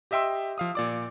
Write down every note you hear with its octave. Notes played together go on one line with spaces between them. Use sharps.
G4 D#5 E5 G5 C6 E6
F3 F5 D#6
A#2 D5 D6